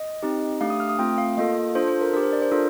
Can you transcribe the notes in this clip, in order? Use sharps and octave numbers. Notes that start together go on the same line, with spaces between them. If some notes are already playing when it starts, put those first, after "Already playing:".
Already playing: D#5
C4 D#4 G4
A3 D4 G4 F5
D#6
F6
D#6
A3 C4 F4 G5
F5
A#3 F4 A4 D#5
D4 F4 A4 C5
C5
A#4
D4 G4 A#4
C5
D5
C5
D4 F4 A4 A#4